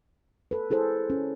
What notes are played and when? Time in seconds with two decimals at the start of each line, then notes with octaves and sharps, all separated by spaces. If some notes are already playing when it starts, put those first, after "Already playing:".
0.51 A4 B4
0.70 E4 G#4 A4 C5
1.10 C#4